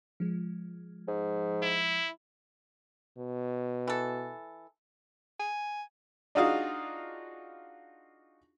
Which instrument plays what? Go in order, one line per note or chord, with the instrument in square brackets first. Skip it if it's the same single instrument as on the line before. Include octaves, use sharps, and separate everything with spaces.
[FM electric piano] F3 G#3
[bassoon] G#2
[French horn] E4
[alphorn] B2
[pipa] E3 A4
[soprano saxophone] G#5
[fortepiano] D4 D#4 F4 F#4 G#4 F5